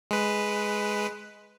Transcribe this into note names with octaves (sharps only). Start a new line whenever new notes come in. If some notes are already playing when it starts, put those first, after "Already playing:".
G#3 B4